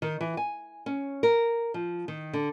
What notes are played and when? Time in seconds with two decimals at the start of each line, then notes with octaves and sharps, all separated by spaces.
0.02 D#3
0.21 E3
0.37 G#5
0.86 C#4
1.23 A#4
1.74 F3
2.08 D#3
2.33 D3